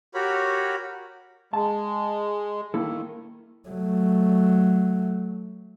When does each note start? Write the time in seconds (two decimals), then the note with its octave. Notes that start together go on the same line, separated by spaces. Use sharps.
0.14 F#4 G4 A#4 C#5 B5
1.53 G#3 A5
2.74 D#3 A#3 E4 A4
3.69 F#3 A3